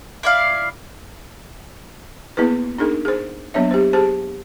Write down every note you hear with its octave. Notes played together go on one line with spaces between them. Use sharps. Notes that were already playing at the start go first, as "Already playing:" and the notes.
E4 D5 F5
A#3 B3 E4 G#4 B4
D4 D#4 G#4 A#4
G#4 C5
F#3 A#3 B3 D4 C#5 E5
G4 C5
G4 G#4 C5 A5